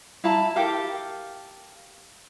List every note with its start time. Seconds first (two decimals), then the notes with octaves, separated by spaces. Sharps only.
0.24 E4 F5 A5 A#5
0.56 G4 A4 A#4 F5